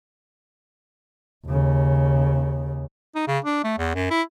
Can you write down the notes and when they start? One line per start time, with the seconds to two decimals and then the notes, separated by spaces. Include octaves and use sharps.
1.47 D#2 C#3
3.15 D#4
3.27 C#3
3.45 D4
3.64 A3
3.78 E2
3.95 F#2
4.10 E4